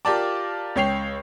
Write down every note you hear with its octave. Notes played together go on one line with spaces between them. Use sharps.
F4 G4 A#4 D5 A5 D6
C#2 C#5 G5 C7 F7